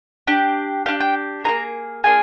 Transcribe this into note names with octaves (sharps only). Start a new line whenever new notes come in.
D4 G4
D4 G4 F5
G5
A#3 F4 G#4 A#5
A#3 D4 F4 G#4 G#5